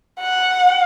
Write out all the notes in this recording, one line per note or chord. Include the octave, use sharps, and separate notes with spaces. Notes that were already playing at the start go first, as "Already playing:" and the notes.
F#5